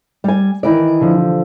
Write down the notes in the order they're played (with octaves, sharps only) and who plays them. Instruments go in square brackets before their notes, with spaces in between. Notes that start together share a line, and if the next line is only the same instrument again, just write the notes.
[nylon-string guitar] G3 G#5
D#3 E3 D5
[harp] D3 F3